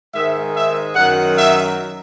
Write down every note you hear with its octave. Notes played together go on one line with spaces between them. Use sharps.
G#2 D#3 G#3 E5
E5
F#2 D#3 F#3 F#5
E5